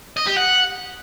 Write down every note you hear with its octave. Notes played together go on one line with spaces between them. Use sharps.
D#5
G4
F#5